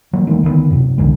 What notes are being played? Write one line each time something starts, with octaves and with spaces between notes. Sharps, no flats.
E3 F#3 G3 A#3
D#3 E3 G#3 A#3
D2 D#3 G#3 B3
F#2 C3
C2 D3 E3 G#3